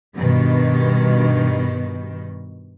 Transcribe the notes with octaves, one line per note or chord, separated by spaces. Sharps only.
G2 B2 D#3